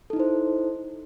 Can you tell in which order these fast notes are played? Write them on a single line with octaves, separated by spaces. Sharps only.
A4 D#4 E4 C5